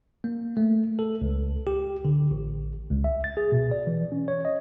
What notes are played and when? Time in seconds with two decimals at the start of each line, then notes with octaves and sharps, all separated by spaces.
0.24 A#3
0.57 A3
0.99 A4
1.21 C#2
1.67 G4
2.05 D3
2.31 A1
2.90 C#2
3.04 E5
3.24 A6
3.37 G#4
3.52 B2
3.71 D5
3.87 E3
4.12 C#4
4.28 C#5
4.45 D#5